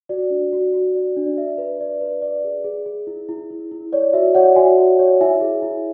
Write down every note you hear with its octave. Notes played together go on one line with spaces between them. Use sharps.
F#4 D5
D4
F#4
F#4
D5
D4
D5
D5 E5
B4
D5
B4
D5
G#4
G#4
G#4
E4
E4
E4
E4
C#5 D5
F#4 E5
C#5 D5 F#5
F#4 E5 G#5
C#5
C#5
E4 E5 G#5
G#4
E4